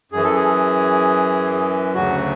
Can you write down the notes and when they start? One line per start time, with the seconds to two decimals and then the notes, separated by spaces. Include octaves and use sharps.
0.12 F#2 E3 G#4
0.24 A4
0.36 G#4
1.94 D2 C#3 F#3 F#4